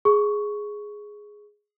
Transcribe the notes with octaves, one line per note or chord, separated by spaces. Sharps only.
G#4 C#6